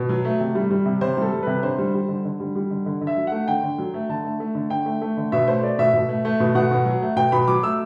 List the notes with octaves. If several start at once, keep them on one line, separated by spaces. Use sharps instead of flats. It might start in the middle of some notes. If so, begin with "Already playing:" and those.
Already playing: B2
F#3
A3
C3
G3
G3
C3
C3 C5
G3 A4
G3
C3 B4
D3 C5
G3
G3
D3
D3
G3
G3
D3
D3
D3
E5
F#3
A3 F#5
D3 G5
D3
F#3
A3
D3 A5
A3
A3
D3
D3 G5
A3
A3
D3
B2 E5
A3 C5
A3 D5
B2 E5
B2
A3
A3
B2
B2 F#5
B2
F#3
A3
B2 G5
B2 B5
F#3 D6
A3 E6